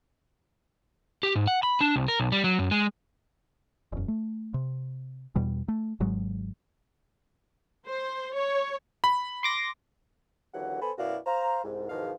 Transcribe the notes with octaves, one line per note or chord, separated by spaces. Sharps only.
G4
G#2
F#5
B5
D4
C2
A#4
B1
G3
F#3
F#2
G#3
E1 F#2
A3
C3
E2 B2 G3
A3
G#1 G#2 F#3 G#3
C5
C#5
B5
C6 D6 A#6
D#2 D3 E3 F#3 F#5
B3 A4 C5 G#5 B5
F#2 B2 E4 F#4 D5 F5
C5 F5 A#5
C2 G#2
E2 G#2 B2 D#3 F3 F5